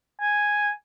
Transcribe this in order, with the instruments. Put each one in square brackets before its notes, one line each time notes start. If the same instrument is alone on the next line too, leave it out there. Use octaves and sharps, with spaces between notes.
[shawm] G#5